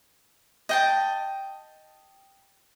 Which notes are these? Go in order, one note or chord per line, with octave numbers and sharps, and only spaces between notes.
D#5 G5 A5